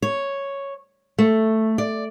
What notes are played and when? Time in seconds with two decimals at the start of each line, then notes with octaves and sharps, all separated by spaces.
0.02 C#5
1.18 A3
1.78 D5